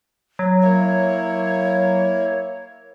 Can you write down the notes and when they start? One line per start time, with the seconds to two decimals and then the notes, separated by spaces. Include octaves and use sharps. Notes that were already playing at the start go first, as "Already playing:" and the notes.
0.39 F#3
0.62 A#3 E4 C#5